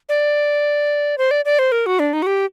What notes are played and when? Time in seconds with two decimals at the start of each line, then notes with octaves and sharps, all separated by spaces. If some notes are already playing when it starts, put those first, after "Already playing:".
0.09 D5
1.18 C5
1.31 D5
1.45 D5
1.59 C5
1.72 A#4
1.86 F#4
1.99 D4
2.13 D#4
2.22 F#4
2.26 G4